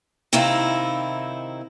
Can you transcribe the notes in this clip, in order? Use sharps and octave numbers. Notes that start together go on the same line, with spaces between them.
C3 D#3 C4 D#4 E4 F5